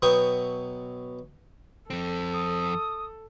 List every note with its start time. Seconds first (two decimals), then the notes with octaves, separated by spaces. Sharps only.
0.02 B2 F#3 B3 G5 C#6 D#6
1.90 F2 C4 A4
2.33 D#6